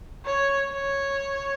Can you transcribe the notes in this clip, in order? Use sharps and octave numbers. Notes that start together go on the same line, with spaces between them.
C#5
C#5